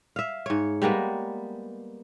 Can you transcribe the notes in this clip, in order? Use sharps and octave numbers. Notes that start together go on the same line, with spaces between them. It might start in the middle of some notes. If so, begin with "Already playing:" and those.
E5 F5
G#2 C#5
G3 G#3 A#3 B3